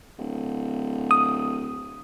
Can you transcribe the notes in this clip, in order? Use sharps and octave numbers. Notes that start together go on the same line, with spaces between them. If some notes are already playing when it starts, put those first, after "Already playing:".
D1
D#6